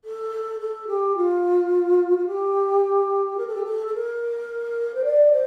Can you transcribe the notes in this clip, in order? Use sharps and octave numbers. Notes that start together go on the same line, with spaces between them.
A4
A4
G4
F4
F4
G4
A#4
A4
G4
A4
A4
A#4
C5
D5
C5